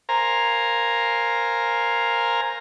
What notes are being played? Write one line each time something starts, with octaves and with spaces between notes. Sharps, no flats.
A#4 C5 F5 G#5 A#5